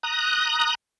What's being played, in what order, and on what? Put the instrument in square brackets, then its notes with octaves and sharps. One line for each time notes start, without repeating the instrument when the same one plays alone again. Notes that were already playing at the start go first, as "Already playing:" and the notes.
[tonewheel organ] A#5 D#6 F#6